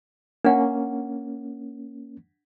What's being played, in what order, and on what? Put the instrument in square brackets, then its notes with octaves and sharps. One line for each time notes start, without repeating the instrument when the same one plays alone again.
[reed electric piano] A#3 C#4 [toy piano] D4 F#5